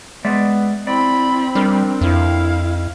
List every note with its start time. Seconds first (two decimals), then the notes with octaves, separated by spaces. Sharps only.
0.25 G#3 B3 D5 E5
0.87 C4 E4 D5 B5
1.55 G3 D4 A#4
2.01 F2 E4 F5